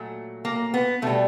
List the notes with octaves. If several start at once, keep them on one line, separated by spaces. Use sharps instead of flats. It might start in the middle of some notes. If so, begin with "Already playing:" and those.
Already playing: A#2 F#3 A3
A#3
B3
B2 G3 A3